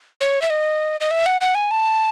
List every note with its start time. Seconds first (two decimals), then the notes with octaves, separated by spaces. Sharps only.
0.21 C#5
0.42 E5
0.50 D#5
1.00 D#5
1.11 E5
1.26 F#5
1.41 F#5
1.55 G#5
1.71 A5